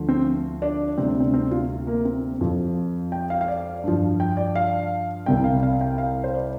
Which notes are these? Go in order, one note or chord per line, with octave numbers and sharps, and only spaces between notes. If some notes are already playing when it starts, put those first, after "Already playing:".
Already playing: D2 D3 F3
C4
D4
D2 C3 G3 C4
D4
C4
C4
F4
A#3
C4
F2 F3
G5
F5
F5
D5
G2 F3
G5
D5
F5
C2 C3 G3 G5
F5
F5
G5
F5
C5
D5